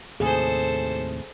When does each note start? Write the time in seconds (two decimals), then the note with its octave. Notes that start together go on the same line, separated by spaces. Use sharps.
0.20 D#2 A2 C3 G#4 A4 C5